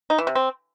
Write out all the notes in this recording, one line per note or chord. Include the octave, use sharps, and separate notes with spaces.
D#4
E3
C3
C4